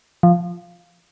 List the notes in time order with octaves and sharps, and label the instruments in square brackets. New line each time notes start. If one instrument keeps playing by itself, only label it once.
[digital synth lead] F3